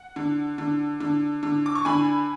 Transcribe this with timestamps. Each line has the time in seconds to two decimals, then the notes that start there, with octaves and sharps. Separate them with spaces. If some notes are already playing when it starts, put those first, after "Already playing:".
Already playing: F#5
0.16 D3
0.58 D3
1.00 D3
1.43 D3
1.66 D6
1.75 C#6
1.85 D3 G#5 B5